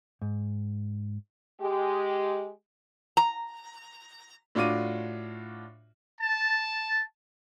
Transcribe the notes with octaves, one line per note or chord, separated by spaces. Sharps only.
G#2
G#3 G4
A#5
A2 D4 F4 F#4 D6 D#7
A5